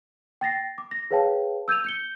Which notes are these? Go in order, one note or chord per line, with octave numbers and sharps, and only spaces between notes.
G5 A6 A#6 C7
D6
A#6
G#4 B4 C#5 F5 G5 A5
E6 G6 G#6 D#7 F7
G6 C#7 G7